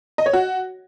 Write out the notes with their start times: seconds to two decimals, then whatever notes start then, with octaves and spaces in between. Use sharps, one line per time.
0.18 D#5
0.26 C#5
0.33 F#4